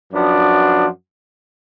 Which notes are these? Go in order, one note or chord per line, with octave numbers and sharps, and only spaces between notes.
F#2 F3 B3 D4 F#4